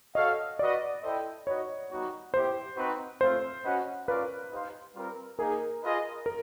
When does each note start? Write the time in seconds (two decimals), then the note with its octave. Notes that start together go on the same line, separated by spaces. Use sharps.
0.15 F#4 A4 C#5 D#5 F5
0.59 F#4 B4 D5 D#5
1.03 E4 A4 C5 D#5 G5
1.47 D#4 F#4 B4 C#5 D#5
1.90 G3 B3 D#4 F#4
2.33 B3 E4 G4 C5
2.77 C4 D#4 F#4 B4
3.21 A3 C4 F4 C5
3.64 C#4 F#4 B4 D#5 F#5
4.07 C#4 F4 A#4 B4 D5 F5
4.51 D#4 G4 C5 F5
4.95 G3 C4 F4 A#4
5.39 A#3 D#4 G#4 A#4
5.83 F4 G#4 B4 D#5
6.26 A#4